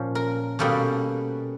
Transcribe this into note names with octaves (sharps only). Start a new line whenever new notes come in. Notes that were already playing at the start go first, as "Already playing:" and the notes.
Already playing: A#2 F3 C#4
A#4
B2 G3 A#3 C#4 A4